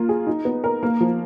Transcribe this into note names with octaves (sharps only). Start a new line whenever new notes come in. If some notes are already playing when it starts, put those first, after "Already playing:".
Already playing: A#3 F4
G#4
D#4
B3
A#4
A#3
F3